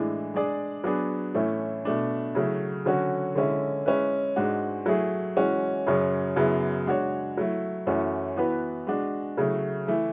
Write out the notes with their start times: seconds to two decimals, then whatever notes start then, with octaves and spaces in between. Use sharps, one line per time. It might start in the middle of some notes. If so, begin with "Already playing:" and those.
Already playing: A2 E3 G#3 D4
0.34 G#3 D4 G#4 D5
0.84 F#3 B3 D4 G#4
1.34 A2 E3 A3 C#4 E4
1.85 B2 A3 D4
2.35 C#3 F#3 A3 E4
2.85 D3 F#3 C#4 F#4
3.35 D3 G#3 C#4 E4
3.86 G#3 C#4 E4 B4
4.36 G#2 G#3 D4 F#4
4.86 F#3 A3 E4 G#4
5.37 E3 G#3 C#4 F#4
5.87 F#2 C#3 F#3 C#4
6.36 F#2 C#3 F#3 B3 E4
6.86 G#3 D4 F#4 C#5
7.37 F#3 A3 E4
7.87 F#2 E3 A3 C#4 F#4
8.37 E3 B3 F#4 B4
8.87 G#3 D4 F#4
9.37 C#3 F#3 A3 E4
9.87 E3 A3 E4